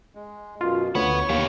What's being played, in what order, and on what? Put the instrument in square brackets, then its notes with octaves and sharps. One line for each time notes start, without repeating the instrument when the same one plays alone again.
[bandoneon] G#3
[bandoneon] F#2 B2 [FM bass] F4
[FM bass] D2 [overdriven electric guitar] B3 B4 [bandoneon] C#5 C#6
[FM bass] D#2 [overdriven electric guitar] G4 F5